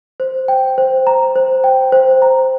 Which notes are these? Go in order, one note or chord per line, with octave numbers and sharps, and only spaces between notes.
C5
G5
C5
A#5
C5
G5
C5
A#5